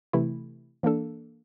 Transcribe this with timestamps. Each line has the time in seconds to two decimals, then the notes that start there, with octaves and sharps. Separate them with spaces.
0.13 C3 E3 A3 E4
0.83 E3 A#3 D4 A4